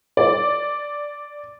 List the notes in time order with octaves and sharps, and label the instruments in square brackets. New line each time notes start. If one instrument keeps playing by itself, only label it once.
[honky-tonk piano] D5